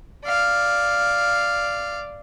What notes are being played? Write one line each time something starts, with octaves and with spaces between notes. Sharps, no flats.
D5 F5